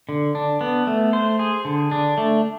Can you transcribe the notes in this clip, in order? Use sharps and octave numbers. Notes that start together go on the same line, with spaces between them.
D3
D4
B3
A3
C5
G#4
D3
D4
A3